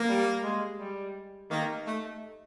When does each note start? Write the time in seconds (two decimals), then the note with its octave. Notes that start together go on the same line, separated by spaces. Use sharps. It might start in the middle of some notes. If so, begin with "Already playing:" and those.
Already playing: A#3
0.08 G3
0.43 G#3
0.79 G3
1.51 D#3 A#3
1.86 A3